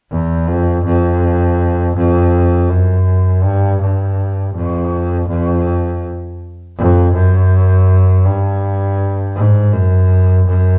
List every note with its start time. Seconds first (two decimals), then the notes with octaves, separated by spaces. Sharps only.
0.11 E2
0.47 F2
0.84 F2
1.96 F2
2.69 F#2
3.43 G2
3.81 G2
4.54 F2
5.28 F2
6.77 F2
7.13 F#2
8.25 G2
9.36 G#2
9.73 F#2
10.47 F#2